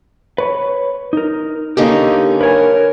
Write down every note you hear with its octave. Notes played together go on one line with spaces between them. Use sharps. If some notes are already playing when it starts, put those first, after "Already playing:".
B4 C#5
D#4 A#4
D3 A#3 C#4 D#4 G4
A#4 B4 C#5 G#5